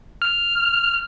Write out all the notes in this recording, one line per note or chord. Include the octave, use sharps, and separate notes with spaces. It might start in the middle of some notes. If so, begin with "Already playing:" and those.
F6